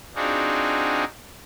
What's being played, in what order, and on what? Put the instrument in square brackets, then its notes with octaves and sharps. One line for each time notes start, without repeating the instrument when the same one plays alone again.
[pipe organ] C4 D4 D#4 F4 F#4 G#4